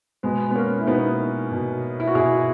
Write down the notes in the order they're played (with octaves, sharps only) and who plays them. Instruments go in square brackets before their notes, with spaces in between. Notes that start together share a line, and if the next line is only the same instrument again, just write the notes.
[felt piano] B2 G#3 B3
B3
A#3 C#4
E4
B2 B3 D#4
B2
E4
F#4
B2 E4 G#4